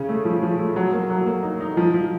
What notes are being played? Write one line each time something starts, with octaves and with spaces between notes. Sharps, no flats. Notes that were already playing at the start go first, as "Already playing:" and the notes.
Already playing: C#3 C#4
A3
F3
F3
A3
F#3
A#3
F#3
A#3
D#4
D#4
F3
F3